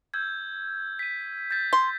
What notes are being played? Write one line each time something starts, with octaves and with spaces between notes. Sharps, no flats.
E6 G6 G#6
B6 D#7
G6 A6 B6
C6